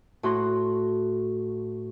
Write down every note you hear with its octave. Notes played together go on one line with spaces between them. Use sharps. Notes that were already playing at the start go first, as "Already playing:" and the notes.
A2 F#4 C6